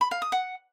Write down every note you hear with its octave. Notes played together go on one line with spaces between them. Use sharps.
B5
F5
D#6
F#5